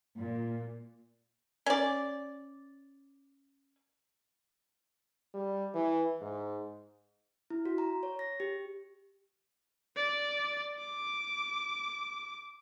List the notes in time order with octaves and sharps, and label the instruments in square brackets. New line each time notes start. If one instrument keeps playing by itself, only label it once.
[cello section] A#2
[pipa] C#4 D5
[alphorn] G3
E3
G#2
[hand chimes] E4
F#4
A#5
C#5
A#6
G4
[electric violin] D5
D6